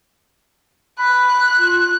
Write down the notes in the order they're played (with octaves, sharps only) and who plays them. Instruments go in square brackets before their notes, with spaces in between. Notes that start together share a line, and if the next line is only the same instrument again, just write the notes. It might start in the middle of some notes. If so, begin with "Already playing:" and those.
[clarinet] B5 [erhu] F#6
[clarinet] F4